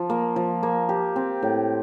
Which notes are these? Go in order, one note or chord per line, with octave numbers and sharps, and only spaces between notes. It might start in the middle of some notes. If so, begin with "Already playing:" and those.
Already playing: F3
A#3
F3
A#3
G4
C4
A2